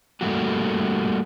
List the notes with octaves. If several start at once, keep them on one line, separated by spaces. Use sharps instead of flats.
G3 A3 A#3 F#4 G4